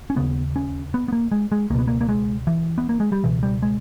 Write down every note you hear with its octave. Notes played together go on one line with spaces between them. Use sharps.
C#4
D#2 C#3 B3
C#4
B3
B3
A#3
G#3
G#3
C#2 B2 A#3 B3
A#3
A#3
G#3
E3
B3
A#3
G#3
G3
C#2 B2 E3
G3
G#3